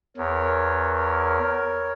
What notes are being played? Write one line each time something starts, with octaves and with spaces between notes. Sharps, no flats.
E2 A#4 C#5